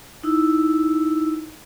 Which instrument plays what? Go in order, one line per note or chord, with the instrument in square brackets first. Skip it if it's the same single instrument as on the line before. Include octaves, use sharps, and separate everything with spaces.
[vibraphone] D#4 E4 E6